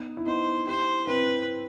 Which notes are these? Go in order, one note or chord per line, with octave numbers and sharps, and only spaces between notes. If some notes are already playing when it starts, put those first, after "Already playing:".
Already playing: B3 D#4
E4
B3 D#4 C5
E4 G4 C5
C4 E4 B4